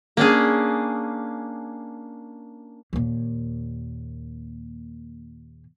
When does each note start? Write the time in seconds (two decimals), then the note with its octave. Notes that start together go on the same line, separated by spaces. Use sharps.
0.17 A#3 C#4 D4 G#4
2.93 D#2 A#2